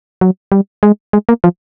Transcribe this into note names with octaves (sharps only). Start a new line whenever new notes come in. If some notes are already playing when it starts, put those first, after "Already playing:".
F#3
G3
G#3
G#3
A#3
F3